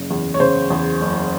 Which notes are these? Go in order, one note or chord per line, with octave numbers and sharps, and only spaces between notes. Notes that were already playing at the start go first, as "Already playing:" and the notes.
Already playing: F#1 C#3
E2
C#5
C#3 C5
E2
F#1